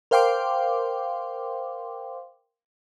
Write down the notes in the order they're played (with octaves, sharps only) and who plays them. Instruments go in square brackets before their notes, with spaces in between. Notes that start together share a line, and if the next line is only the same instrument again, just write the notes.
[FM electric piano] A#4 C5 F5 G5 C6 D6